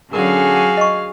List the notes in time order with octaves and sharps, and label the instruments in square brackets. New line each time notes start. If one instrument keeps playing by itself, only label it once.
[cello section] D3 F#3 C#4 [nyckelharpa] F#4 G#5 [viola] G#4 F5 [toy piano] A#4
[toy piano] D#5 C#6